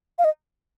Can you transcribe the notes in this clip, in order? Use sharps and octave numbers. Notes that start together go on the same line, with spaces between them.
F5
D#5